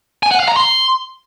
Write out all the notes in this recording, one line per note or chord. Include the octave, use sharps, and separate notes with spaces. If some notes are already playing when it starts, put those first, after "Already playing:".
G#5
F#5
F5
A#5
C6